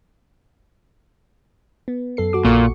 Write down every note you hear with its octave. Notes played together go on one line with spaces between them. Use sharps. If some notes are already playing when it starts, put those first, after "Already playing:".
B3
F#2 A4 C7
F#2 F#4 D6
A#1 A#2 C#6 C#7